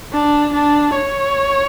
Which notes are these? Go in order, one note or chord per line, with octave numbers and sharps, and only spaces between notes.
D4
D4
C#5